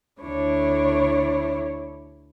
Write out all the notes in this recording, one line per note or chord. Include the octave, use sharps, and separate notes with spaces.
D2 D4 E4 C#5